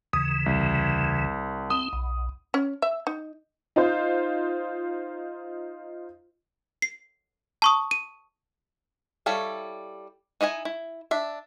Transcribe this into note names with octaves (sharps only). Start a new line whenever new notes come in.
D#2 C#3 E3 D#6
C2
C4 D#6
B1
C#4
E5
D#4
D#4 F4 C5
C7
A5 C#6 D#6
D#7
G3 E4 A4 C#5 F5
D#4 E4 D#5 G#5
E4
D4 E5